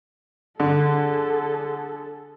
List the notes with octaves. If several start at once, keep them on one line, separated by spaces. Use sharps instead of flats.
D3 G#4 A4